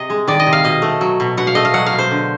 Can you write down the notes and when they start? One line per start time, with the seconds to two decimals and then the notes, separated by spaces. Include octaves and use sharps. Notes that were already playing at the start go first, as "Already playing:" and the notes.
Already playing: C3 D#5
0.10 G#3
0.27 D#3 D5
0.40 D#5
0.46 C3
0.53 F5
0.64 B2 D#5
0.82 A3
1.01 F#3
1.20 B2
1.37 B2 F#5
1.47 F5
1.55 A3 D#5
1.65 F5
1.74 F#3 F#5
1.86 F5
1.92 B2
1.98 C5
2.11 D3